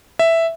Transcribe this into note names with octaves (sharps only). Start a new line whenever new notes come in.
E5